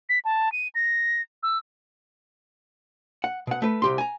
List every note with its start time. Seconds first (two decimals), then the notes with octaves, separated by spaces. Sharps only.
0.09 B6
0.25 A5
0.52 D#7
0.75 A#6
1.43 E6
3.24 F#5
3.47 B2 F#5
3.62 A3 B4
3.82 C2 G4 C6
3.98 G#5 A#5